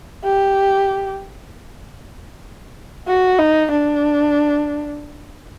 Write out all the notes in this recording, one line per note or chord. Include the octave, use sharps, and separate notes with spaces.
G4
F#4
D#4
D4